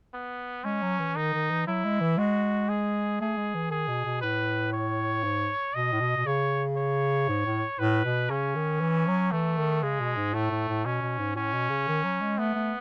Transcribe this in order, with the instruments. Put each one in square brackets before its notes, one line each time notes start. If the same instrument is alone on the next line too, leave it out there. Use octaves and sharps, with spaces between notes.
[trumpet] B3
[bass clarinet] G#3 [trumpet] C#4
[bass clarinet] F#3
E3
[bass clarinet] D#3 [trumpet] D#4
[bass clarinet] D#3
E3
[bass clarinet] F#3 [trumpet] E4
[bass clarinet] G#3
E3
[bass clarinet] G#3 [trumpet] F#4
[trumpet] G#4
[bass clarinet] A3 [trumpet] G#4
[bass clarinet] G#3
E3
[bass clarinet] D#3 [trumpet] G#4
[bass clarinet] B2
B2
[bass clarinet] A2 [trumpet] B4
[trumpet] C#5
[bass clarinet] G#2
[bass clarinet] B2 [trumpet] D#5
[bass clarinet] A2
B2
B2
[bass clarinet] C#3 [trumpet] C#5
[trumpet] C#5
[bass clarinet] G#2
A2
[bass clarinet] A2 [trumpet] B4
[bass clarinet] B2
[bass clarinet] C#3 [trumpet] C#4
[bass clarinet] D#3
E3
F#3
[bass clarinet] E3 [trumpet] A3
[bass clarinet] D#3
[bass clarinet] C#3 [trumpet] G#3
[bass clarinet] B2
G#2
[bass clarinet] A2 [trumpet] A3
[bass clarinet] A2
A2
[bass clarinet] B2 [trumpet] C#4
[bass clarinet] B2
G#2
[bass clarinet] A2 [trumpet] C#4
[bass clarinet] B2
C#3
D#3
F#3
G#3
[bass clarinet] A3 [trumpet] B3
[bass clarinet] A3